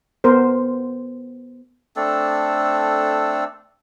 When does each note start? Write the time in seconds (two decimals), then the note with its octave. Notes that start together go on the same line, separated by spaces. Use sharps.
0.24 B3 A#4 C5
1.96 A3 C4 D4 A4